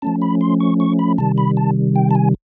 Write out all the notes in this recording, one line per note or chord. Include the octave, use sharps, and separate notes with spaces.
F3 A3 C#4 A5
B5
C6
C#6
C#6
B5
C3 D#3 G3 A5
B5
A5
G5
A5
G#5